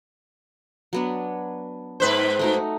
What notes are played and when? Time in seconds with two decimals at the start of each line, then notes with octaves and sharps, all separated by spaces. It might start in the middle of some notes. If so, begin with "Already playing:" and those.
0.93 F#3 B3 D4
2.00 G#2 B4 C5
2.39 A3 D#4 F#4